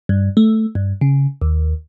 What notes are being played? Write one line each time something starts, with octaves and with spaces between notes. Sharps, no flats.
G2
A3
G2
C#3
D#2